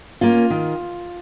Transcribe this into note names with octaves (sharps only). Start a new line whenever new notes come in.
A#3 C#4 F4
D#3